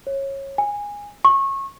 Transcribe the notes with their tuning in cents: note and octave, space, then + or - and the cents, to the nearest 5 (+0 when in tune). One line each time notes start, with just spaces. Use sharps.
C#5 -20
G#5 -15
C#6 -25